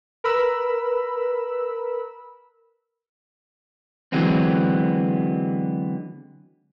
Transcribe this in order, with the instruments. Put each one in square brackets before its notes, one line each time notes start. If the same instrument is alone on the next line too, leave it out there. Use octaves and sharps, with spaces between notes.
[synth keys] A#4 B4 B5 E6
[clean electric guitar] D3 E3 F#3 G#3 B3 C4